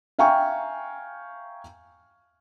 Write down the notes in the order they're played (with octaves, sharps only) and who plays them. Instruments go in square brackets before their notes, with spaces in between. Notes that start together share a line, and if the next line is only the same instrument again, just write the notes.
[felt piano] E5 F5 G5 G#5 A#5 C#6